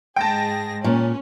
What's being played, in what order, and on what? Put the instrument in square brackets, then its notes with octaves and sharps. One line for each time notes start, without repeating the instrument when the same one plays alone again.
[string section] G#2 G#4 A#6 [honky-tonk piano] G5 A5
[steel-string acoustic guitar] A#2 [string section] C#4